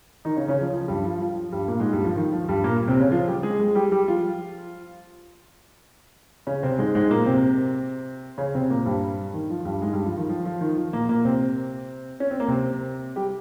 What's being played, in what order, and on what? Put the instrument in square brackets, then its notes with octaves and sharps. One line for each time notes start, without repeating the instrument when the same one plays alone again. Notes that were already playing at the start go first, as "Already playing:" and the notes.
[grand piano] D#3 D#4
C#3 C#4
C#3 C#4
F3
F3
G2 G3
F3
F3
F3
G2 G3
A#2 A#3
G#2 G#3
G2 G3
F3
D#3
F3
G2 G3
A#2 A#3
C3 C4
C#3 C#4
F3 F4
G3 G4
G#3 G#4
G#3 G#4
G3 G4
G3 G4
F3 F4
C#3 C#4
C3 C4
G#2 G#3
G#2 G#3
A#2 A#3
C3 C4
C#3 C#4
C3 C4
A#2 A#3
G2 G3
D#3
F3
G2 G3
G#2 G#3
G2 G3
F3
D#3
F3
F3
D#3
F3
A#2 A#3
A#2 A#3
C3 C4
C#4
C4
A#3
C3 C4
G3 G4